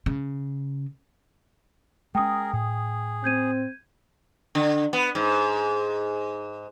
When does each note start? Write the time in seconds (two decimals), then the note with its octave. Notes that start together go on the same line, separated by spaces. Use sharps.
0.06 C#3
2.15 G#3 C#4 G#4 A#4 G5 D#6
2.53 A2 G#4
3.24 C4 G6 G#6 D#7
4.55 D3
4.93 B3
5.15 G#2